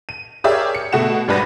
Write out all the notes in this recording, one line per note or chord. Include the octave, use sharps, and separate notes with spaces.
D#7
G4 G#4 A#4 C#5 D5 E5
C#7
B2 A3 F#4 F#5 E7
G#1 G3 D4 B4 B5 A#6